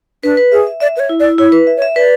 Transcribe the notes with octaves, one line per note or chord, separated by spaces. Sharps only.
D4 B4
B4
G#4 E5
E5
D5 E5
B4 C#5 E5
E4
D5
E4
E4 C#5
B4
E5
C#5
E5
B4 D5